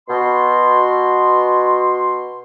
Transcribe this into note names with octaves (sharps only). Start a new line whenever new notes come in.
B2 C6